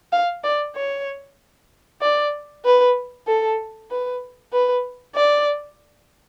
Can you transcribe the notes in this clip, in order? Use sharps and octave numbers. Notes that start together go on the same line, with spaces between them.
F5
D5
C#5
D5
B4
A4
B4
B4
D5